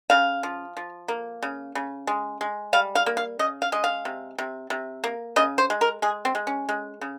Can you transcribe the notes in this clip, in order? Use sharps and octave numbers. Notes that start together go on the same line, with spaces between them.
C#3 F5
F3
F3
A#3
C#3
C#3
G#3
G#3
G3 F5
F5
A#3
F5
C#3 D#5
F5
G#3 D#5
F5
C3
C3
C3
A#3
C#3 D#5
C5
G#3
A#4
G#3 G#4
C4
G#3
C#4
G#3
C#3